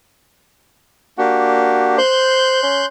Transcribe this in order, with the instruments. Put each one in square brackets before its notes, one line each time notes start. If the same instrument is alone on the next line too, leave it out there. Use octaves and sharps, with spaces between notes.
[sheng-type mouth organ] A#3 D4 G4 [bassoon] F#4
[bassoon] C5 [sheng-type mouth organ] C6 F#6 G6
[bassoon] C#4